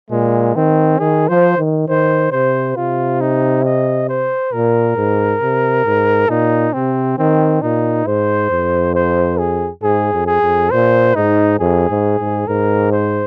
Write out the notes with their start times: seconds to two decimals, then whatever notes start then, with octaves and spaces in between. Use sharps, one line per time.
0.10 A#2 G#3
0.56 D#3 C4
0.99 D#3 G#4
1.28 F3 C5
1.58 D#3
1.88 D#3 C5
2.32 C3 C5
2.76 C3 F4
3.21 D#4
3.64 D#5
4.09 C5
4.52 A#2 A#4
4.97 G#2
5.41 C3
5.85 G#2
6.29 A#2 D#4
6.73 C3 C4
7.18 D#3 C4
7.62 A#2 D#4
8.06 G#2 C5
8.50 F2
8.95 C5
9.38 G#4
9.83 G#2 G#4
10.13 F2
10.27 G#4
10.42 F2
10.71 A#2 C5
11.15 G#2 D#4
11.59 F2 G#4
11.90 G#2
12.19 G#2
12.48 G#2 A#4
12.92 C5